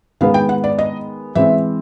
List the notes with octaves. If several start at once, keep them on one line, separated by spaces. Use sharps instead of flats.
D#3 G#3 B3 F5
G5
F#5
D5
D#5
E3 G#3 C4 E5